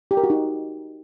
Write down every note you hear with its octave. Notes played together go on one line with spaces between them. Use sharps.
G4
A#4
F#4
D#4